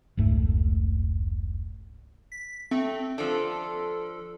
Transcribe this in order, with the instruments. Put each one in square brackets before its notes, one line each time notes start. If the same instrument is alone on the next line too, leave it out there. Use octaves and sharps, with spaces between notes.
[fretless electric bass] F1 C#2 G#2 A3
[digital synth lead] B6
[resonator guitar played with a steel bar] A3 [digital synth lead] C4
[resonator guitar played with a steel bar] F3 D4 [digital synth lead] A4